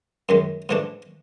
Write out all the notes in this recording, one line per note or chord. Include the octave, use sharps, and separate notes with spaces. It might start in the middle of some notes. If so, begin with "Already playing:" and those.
F#2 D#3 G#3
G#2 E3 A3 D4